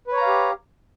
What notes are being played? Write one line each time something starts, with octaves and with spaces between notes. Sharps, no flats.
G4 B4 C#5 F5 A#5